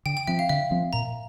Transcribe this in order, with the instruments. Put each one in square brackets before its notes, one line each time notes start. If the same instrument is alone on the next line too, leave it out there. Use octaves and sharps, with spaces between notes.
[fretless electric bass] D3 [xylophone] G5
[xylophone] G5
[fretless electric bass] F3 C4 [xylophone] E5
[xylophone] F5
[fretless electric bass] D3 [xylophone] E5
[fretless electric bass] F3 C4
[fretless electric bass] A#2 [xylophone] A#5